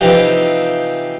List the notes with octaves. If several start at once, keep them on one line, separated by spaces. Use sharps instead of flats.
C3 E3 F3 D#4 G4